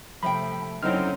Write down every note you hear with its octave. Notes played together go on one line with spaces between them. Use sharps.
C3 F3 A3 E5 G5 B5
F#1 D3 F#3 C4 C#4 D#4 E4 F6